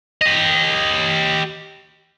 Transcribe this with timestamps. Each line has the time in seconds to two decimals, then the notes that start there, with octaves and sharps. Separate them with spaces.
0.21 G4 D#5